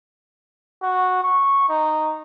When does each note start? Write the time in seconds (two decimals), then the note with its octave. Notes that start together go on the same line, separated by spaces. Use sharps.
0.83 F#4
1.23 C#6
1.69 D#4